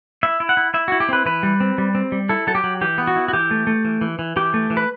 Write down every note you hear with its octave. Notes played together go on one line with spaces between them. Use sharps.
E4 E5
E4
F#5
E4
E4 E5
F#4
E4
G4
C4 B4
E3 B4
G3
C4
G3
C4
G3
E4 A4
F#3 A4
G4
F#3
E3 G4
B3
F#4
E4
F#4
E3 G4
A3
A3
E3
E3
E3
E3 G4
A3
E3
B4